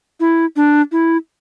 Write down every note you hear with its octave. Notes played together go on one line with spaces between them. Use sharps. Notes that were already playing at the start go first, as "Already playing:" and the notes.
E4
D4
E4